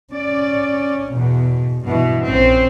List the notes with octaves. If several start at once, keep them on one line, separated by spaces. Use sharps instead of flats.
C#4 D5
E2 B2
G2 B2 E3
A#1 C4 C#4